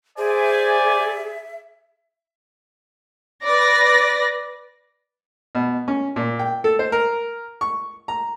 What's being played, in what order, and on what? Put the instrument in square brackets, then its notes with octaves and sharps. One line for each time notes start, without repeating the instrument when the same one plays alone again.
[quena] G#4 [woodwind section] C5 [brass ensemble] D5 G#5 [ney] E5
[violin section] B4 D5 A#6
[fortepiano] B2
C#4
A#2
G5
A4
C5
A#4
C#6
A#5